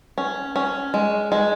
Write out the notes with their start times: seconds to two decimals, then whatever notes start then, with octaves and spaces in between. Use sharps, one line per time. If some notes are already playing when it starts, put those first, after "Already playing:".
0.18 C#4
0.56 C#4
0.94 G#3
1.32 G#3